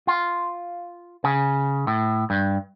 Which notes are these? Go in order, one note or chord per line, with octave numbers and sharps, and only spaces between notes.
F4
C#3
A2
G2